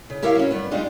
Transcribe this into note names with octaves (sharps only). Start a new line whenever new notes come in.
C#3
E4 G4 A#4 C#5 E5 F5
F#3 C#4
G2 B3
G3 G#3 D4 D#4 F4 G4